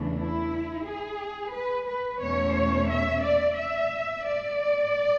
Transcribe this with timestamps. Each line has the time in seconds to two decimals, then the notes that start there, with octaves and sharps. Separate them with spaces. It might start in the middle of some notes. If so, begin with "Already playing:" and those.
Already playing: E2 C#3 E3 A3 D4
0.18 E4
0.86 G#4
1.53 B4
1.87 B4
2.21 E2 B2 A3 C#4 C#5
2.88 E5
3.23 D5
3.56 E5
4.25 D5